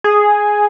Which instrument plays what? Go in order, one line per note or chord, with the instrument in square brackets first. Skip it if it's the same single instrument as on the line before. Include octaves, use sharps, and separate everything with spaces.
[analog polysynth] G#4